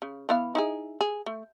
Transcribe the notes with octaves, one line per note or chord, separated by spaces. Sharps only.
C#3
E3 B3 F5
D#4 E4 G#4
G#4
A3